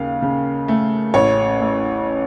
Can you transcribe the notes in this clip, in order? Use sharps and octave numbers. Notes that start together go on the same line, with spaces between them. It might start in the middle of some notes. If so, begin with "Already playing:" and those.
Already playing: D#2 C#3 F5
C#3
A3
A1 C#5
A3